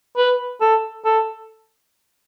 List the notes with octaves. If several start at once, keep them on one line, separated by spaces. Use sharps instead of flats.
B4
A4
A4